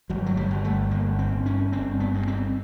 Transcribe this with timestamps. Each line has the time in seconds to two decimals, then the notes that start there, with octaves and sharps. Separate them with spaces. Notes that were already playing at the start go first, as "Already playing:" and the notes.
0.10 G1 F#3
0.26 F#3
0.37 G3
0.51 G1
0.64 A3
0.91 G1 A#3
1.19 C4
1.32 G1
1.46 C#4
1.72 G1 C4
2.00 B3
2.14 G2
2.27 C4